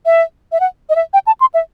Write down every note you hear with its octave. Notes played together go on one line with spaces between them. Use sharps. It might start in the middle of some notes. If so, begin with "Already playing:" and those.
E5
E5
F#5
D#5
E5
G5
A5
C6
E5